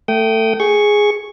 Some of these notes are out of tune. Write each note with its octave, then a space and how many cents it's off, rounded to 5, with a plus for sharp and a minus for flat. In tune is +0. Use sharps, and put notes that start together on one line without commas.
A3 +20 G5 -25 D#6 +0
G#4 +0 C#6 +0